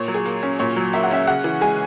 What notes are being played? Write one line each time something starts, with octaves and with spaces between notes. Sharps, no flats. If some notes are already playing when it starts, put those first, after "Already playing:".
Already playing: A#2 C#5
F#3
G#4
A#3
C#4
A#2 C#5
F#3
A#3 E5
F#5
C#4 E5
C#3 F#5
E3
G#3 G#5